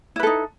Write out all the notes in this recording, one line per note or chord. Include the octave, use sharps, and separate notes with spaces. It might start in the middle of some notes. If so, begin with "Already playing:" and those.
D#4 E4 A4 B4